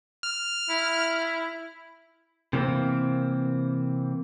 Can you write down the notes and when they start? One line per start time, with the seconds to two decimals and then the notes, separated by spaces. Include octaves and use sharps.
0.23 F6
0.69 E4
2.53 C3 E3 A#3 C4